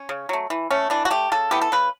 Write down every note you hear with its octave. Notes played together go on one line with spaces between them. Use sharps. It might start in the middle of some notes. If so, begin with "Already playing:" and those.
Already playing: C#4
C#3
F#3 A3
E3
A3 C#4
E3 D4
F#4
A3 G4
C#3 A4
E3 B3 G4
A4
C#3 B4